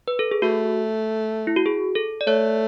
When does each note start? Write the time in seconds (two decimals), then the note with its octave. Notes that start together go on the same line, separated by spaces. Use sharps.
0.08 B4
0.19 A4
0.31 G#4
0.42 A3 F#4
1.47 E4
1.56 F#4
1.66 G#4
1.95 A4
2.21 D5
2.27 A3 C#5